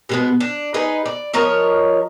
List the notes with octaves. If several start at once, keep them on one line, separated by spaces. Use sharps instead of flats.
B2 G#3 B3
D4
D#4 G#4 B4 D#5
D5
F3 A#4 C#5 D#5